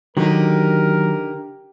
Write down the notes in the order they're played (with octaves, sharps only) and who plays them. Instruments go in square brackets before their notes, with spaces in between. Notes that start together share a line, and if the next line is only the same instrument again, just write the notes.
[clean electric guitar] D3 D#4 [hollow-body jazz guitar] D#3 F#3 [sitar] G4 [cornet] A#4